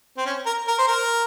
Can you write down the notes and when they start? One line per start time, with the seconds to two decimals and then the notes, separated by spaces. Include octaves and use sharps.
0.17 C4
0.26 C#4
0.46 A#4
0.67 A#4
0.78 C5
0.87 A#4